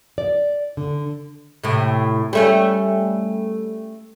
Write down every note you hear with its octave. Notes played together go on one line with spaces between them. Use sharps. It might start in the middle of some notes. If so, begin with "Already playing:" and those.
D5
D3
A2 C3
G3 A3 C#4